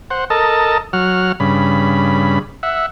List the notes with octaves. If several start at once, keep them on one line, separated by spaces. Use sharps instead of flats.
C5 F#5
A4 A#4 D#5 A5
F#3 F#5 F6
G2 C#3 B5
E5 F#5